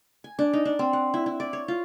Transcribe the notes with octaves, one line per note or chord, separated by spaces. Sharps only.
G#5
D4
D#4
D4
C4
F#5
E4
E4
D5
C#5
F4